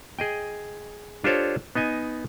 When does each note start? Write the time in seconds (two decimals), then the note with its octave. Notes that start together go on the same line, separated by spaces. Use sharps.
0.19 G#4 D#5 G5
1.24 D4 F4 G4 A4 C5 C#5
1.75 B3 D#4 D#5 G#5